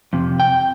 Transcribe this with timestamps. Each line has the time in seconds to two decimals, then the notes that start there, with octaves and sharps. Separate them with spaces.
0.13 F2 C3
0.40 G5